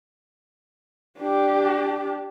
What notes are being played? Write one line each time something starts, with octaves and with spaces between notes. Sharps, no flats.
D4 G4